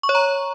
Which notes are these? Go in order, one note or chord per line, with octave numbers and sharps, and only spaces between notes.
C#6
C#5
A#5